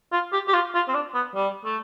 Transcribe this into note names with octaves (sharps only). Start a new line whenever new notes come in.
F4
G4
G4
F4
F4
C4
D4
B3
G3
A3